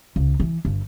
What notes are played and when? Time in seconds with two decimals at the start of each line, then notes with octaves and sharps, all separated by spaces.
0.16 C#2
0.40 E3
0.65 G1